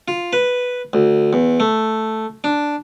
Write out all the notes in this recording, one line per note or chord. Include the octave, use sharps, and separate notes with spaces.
F4
B4
D2
E2
A3
D4